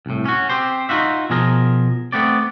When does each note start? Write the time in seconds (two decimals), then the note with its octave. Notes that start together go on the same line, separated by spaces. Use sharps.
0.06 C2 A2
0.25 C#4 F#4
0.50 C4 G4 C5
0.89 D#4 F4 F#4 E5
1.30 B2 F3 G#4 A#4
2.12 A3 B3 C4 D5